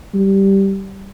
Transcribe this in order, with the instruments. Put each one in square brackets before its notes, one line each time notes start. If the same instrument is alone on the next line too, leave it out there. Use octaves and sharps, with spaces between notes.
[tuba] G3